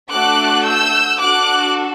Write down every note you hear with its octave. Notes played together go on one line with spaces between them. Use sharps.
A3 D4 F#4 A4 D6 F#6
E6 G6
D4 F#4 A4 D6 F#6